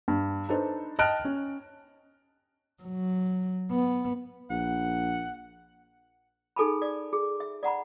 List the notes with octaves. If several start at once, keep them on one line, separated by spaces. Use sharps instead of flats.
G2
D4 D#4 A4 B4 C5
D#5 G5 A5 F6 F#6 D7
C#4
F#3
B3
A#1 F#5
D#4 G#4 A4 G#5 A5 B5
D5
G#4
E5
D5 F#5 A#5 B5